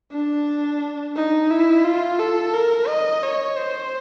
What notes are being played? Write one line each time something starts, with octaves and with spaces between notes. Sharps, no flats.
D4
D#4
E4
F4
A4
A#4
D#5
C#5
C5